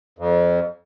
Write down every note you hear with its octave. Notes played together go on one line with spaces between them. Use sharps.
F2